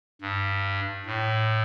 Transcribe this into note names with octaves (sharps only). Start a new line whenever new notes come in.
G2
A2